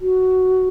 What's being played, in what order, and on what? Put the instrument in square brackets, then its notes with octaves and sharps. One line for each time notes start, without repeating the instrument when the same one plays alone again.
[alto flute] F#4